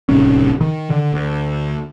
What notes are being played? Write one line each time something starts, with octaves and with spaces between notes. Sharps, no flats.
D1 C2 D#3 C#4
D#3
D3
D2